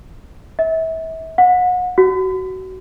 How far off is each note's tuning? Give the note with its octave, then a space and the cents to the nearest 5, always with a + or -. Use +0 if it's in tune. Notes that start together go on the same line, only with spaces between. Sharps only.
E5 -35
F#5 -35
F#4 +20